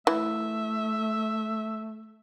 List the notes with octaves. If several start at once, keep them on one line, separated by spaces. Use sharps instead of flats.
E3 A3 E5